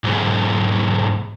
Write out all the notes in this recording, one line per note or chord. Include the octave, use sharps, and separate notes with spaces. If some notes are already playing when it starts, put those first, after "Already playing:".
B1 G#2